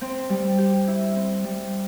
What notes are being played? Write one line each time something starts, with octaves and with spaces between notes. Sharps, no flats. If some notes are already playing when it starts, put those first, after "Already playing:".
C4
G3
G4
E4
C4
G3